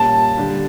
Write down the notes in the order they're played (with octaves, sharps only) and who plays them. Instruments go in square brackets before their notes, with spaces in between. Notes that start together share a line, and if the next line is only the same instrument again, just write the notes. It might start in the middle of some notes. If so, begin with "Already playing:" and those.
Already playing: [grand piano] A#2 G3 C#4 [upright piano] A5
[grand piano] D3 G3 D4 G4